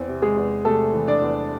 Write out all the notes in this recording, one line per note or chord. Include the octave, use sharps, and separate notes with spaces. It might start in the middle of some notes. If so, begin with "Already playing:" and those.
Already playing: E2 C4
C3
G#3 G#4
E2
C3 A3 A4
E3
D4 D5
E2